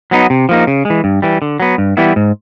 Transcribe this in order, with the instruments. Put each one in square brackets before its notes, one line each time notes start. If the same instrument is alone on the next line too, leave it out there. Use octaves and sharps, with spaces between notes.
[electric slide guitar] F#3 B3 D#4
C3
F3 A#3 D#4
C#3
G#3
E3
G2
E3 G3
D3
F#3 B3
G2
E3 G3 B3 E4
G#2